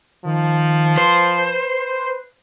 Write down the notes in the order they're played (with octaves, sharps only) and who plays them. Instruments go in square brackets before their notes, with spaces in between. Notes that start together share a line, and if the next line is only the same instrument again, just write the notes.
[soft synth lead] D#3 [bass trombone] F3
[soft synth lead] B4 [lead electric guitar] C5